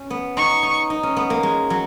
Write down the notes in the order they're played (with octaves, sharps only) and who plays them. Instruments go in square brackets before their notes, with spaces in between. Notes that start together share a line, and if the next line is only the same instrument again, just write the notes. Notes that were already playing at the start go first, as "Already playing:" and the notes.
Already playing: [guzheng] C#4
B3
[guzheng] D#4 [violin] C#6
[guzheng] D#4
D#4
C#4
B3
A#3
G#3
F#3